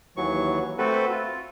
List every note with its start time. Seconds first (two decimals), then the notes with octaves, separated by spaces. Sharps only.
0.17 D#2 E3 F#3 C#6
0.78 A3 C4 F#4 A4 B4
1.10 F4